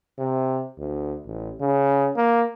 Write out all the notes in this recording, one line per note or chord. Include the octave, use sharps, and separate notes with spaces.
C3
D2
A1
C#3
A#3